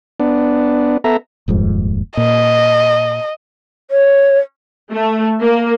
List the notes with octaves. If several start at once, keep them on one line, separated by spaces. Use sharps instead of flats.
B3 D4
B3 A4 E5 A#5
D#1 F2 G#2
A#2 D#5
C#5
A3
A#3